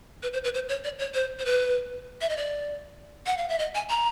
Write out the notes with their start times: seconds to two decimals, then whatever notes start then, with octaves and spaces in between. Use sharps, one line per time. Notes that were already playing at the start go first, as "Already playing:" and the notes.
0.23 B4
0.33 C5
0.44 B4
0.54 C5
0.69 C#5
0.84 D5
0.99 C#5
1.14 C5
1.39 C5
1.45 B4
2.21 E5
2.29 D#5
2.37 D5
3.26 F#5
3.38 F5
3.49 E5
3.59 D#5
3.75 G#5
3.90 A#5